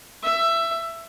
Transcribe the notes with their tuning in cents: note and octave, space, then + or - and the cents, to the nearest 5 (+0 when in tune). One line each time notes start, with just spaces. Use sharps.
E5 +15